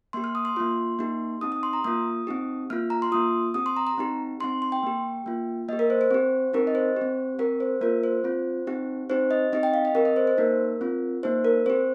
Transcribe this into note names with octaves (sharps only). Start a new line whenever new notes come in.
A#3 G4 C6
F6
D#6
C6
A#3 F4 C6
A#3 D#4 G4
C4 D#4 G4 D#6
D#6
C6
A#5
A#3 F4 D#6
C4 D#4 G4
A#3 F4 F6
A#5
C6
A#3 F4 D#6
C4 G4 D#6
C6
A#5
A#5
C4 D#4 G4
C4 D#4 G4 C6
C6
G5
A#3 G4
A#3 F4
A#3 G4 D#5
A#4
C5
C5
C4 G4
C4 D#4 G4 A#4
D#5
C5
C4 G4
C4 G4 A#4
C5
A#3 F4 A#4
C5
C4 F4
C4 D#4 G4
C4 D#4 G4 C5
D#5
C4 D#4 G4 D#5
G5
F5
D#5
C4 G4 A#4
D#5
C5
C5
A#3 D#4 G4 A#4
C4 F4
A#3 D#4 G4 C5
A#4
C4 G4 C5